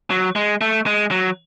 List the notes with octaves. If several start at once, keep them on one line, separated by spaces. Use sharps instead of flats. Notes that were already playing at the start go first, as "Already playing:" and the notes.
F#3
G#3
A3
G#3
F#3